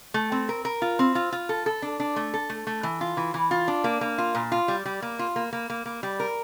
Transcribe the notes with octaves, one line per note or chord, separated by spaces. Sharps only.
A3
C4
A#4
A#4
F4
C4
F4
F4
A4
A4
D4
D4
A3
A4
A3
A3
E3
F4
E3
E3
F4
D4
A#3
A#3
F4
A#2
F4
G3
G3
A#3
F4
A#3
A#3
A#3
A#3
G3
A#4